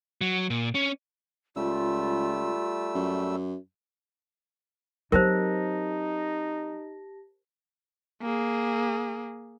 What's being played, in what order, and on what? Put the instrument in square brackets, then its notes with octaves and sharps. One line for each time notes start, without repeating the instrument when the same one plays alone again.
[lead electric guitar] F#3
A#2
C#4
[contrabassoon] C#2 [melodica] G3 A3 E6 [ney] F4
[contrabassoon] F#2
[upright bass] F#3 C4 [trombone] D#4 [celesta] G4 A5 A#6 [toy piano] A#4 C5
[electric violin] A#3 G#4